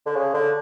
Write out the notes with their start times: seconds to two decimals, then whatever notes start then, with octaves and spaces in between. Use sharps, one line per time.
0.06 D3
0.16 C#3
0.34 D3